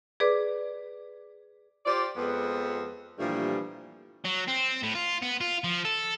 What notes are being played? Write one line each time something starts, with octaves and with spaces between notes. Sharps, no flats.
G#4 B4 D5 D6
F4 G4 C5 D5
F2 F3 G#3 B3
G2 A#2 E3 F3 G3 A3
F#3
C4
A2
F4
B3
F4
F3
A4